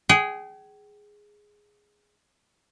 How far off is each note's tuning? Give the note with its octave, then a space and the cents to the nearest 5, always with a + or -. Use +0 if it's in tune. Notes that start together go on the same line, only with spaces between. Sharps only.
G#4 +0 G5 -40